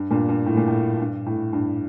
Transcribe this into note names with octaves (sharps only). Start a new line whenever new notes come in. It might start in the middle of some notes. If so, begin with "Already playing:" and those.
Already playing: G2
G2 A#2
G2
A2
A#2
A2
G2
A2
G2